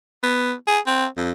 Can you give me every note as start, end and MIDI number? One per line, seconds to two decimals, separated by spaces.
0.23 0.53 59
0.67 0.79 68
0.87 1.06 60
1.17 1.31 41